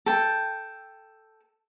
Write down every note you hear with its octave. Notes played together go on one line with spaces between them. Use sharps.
A4 G5